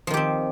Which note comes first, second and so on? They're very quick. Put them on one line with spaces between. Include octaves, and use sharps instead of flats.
F3 D#3 G4 C4